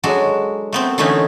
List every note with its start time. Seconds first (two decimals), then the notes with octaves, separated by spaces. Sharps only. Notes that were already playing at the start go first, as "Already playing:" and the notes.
0.04 F#3 G#3 D4 F#4 A4
0.73 A3 B3 C4
0.98 D3 E3 A3 B3 C#4 D#4